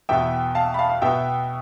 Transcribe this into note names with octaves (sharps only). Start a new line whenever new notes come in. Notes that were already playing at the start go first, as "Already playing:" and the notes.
E2 B2 B3 E5 G5
F5 A5
B5
F5 A5
F5
B2 B3 E5 G5